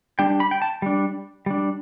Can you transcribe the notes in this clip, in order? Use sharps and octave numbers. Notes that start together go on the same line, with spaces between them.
G3 D4 G5
B5
G5
A5
G3 D4
G3 D4